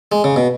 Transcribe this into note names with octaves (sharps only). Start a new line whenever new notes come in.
G#3
C#3
B2